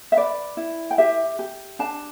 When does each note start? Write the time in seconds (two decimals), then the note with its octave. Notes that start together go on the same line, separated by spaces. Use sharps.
0.12 E5
0.16 B4 D5
0.57 E4
0.91 G5
0.98 G4 E5
1.39 G4
1.79 D4 A5